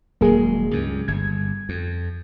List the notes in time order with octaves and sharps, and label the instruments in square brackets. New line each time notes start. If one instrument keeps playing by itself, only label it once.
[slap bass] D#1 F#3 G#3 [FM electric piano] A#3 G#4
[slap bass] C#2 G2
[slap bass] G1 [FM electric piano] G#6
[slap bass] F2